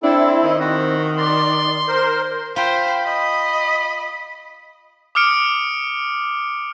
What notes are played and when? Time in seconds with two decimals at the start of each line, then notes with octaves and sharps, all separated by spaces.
0.04 C4 D4 E4 A4
0.44 D#3 D#5
0.60 C4 F#4
1.18 D5 C6
1.88 A#4 C5
2.56 F4 C5 G5 B5
3.05 D#5 B5
5.15 D6 D#6 F6 C#7 D7